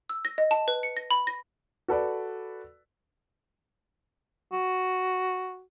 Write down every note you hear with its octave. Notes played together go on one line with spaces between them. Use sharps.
E6
A#6
D#5
A5
B4
C#7
A#6
B5
A#6
F#4 A4 B4 D5
F#4